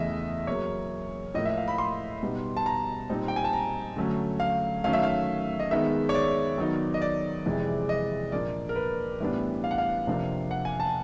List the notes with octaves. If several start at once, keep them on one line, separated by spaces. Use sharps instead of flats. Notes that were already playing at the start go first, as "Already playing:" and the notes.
Already playing: E2 C#3 E3 A3 D#5 E5
C#3 F#3 A#3 C#5
A2 F3 A#3 D#5
E5
F5
B5
C6
B2 G3 B3 D#4
A5
A#5
A#2 G3 C4 D#4
G5
G#5
A5
A#5
D3 F#3 A3 C#4
F5
D#3 F#3 A3 C#4 F5
E5
F5
D#5
D#3 G#3 B3 D#4 E5
C#5
D5
D#3 F#3 B3 D#4
D#5
D5
F2 C3 E3 G#3
D#5
A#2 F3 A#3 D4 D5
A#4
B4
A2 E3 G3 B3 D4
F5
F#5
F5
F2 C3 F3 A#3 D4
F#5
G#5
A5